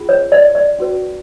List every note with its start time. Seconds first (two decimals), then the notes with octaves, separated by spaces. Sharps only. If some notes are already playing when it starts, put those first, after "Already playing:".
Already playing: C#4 F4 G#4
0.09 C#5
0.32 D5
0.55 D5
0.79 C#4 F#4 B4